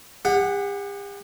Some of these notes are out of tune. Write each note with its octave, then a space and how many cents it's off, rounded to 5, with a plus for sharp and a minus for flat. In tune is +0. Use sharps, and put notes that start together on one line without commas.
G4 +45 F#5 +0